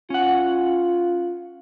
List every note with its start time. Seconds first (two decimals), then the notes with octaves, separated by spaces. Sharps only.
0.10 C#4 F4 F#5